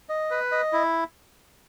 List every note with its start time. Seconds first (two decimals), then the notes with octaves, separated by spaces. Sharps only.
0.09 D#5
0.31 B4
0.52 D#5
0.73 E4